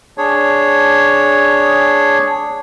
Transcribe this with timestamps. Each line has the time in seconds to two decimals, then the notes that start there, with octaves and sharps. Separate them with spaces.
0.18 D4 G#4 C#5